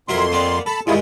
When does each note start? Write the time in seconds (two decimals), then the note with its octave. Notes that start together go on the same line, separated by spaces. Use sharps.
0.09 F2 F#3 E4 A#4 C6
0.32 A#3 B3 D5
0.66 A4 A5 B5
0.87 G2 D#3 G#3 E4 F4 G#4